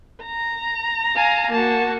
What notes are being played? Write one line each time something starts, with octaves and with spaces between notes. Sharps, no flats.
A#5
F5 G#5
A#3 F#4 A5